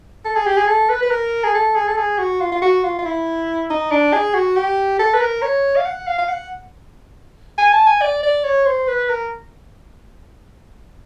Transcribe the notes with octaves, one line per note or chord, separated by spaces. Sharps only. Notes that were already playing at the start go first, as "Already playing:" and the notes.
A4
G#4
G4
G#4
A4
B4
B4
A#4
G#4
A4
G#4
A4
G#4
F#4
F4
F4
F#4
F4
F4
E4
D#4
D4
G#4
F#4
G4
A4
B4
A#4
C#5
F5
F#5
F5
F5
F#5
G#5
A5
G#5
D5
D5
C#5
C5
B4
A#4